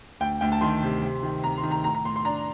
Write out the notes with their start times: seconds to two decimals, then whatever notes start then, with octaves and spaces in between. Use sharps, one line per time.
0.20 D2 G5
0.41 D2 G5
0.52 A5
0.61 D#3 C6
0.83 C3
1.02 C3
1.23 D#3
1.44 C3 A#5
1.58 C6
1.63 D#3
1.71 A#5
1.84 A2 A#5
1.95 A#5
2.05 A2 C6
2.16 C6
2.25 D4 A#5